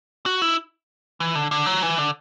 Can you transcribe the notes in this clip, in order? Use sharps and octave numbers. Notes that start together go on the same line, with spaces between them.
F#4
E4
E3
D3
D3
F#3
E3
D3